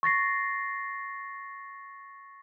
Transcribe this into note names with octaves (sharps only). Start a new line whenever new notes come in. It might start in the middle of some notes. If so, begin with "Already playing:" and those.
C#6 A6 A#6 C7